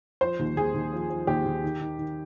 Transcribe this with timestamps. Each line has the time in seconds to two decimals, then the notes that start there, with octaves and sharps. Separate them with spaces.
0.21 F3 C5
0.39 D#2
0.56 D#2 G#4
0.74 D#2
0.93 F3
1.09 F3
1.27 D#2 G4
1.45 D#2
1.64 D#3
1.80 D#3
1.98 D#3